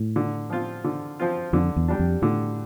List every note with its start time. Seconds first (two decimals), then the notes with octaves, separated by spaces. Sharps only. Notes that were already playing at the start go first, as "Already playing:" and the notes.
Already playing: A2
0.16 D3
0.50 F3 C4 F4
0.84 D3
1.20 F3 C4 F4
1.53 F2 D3
1.76 E2
1.88 G3 D4
1.99 F2
2.22 A2 D3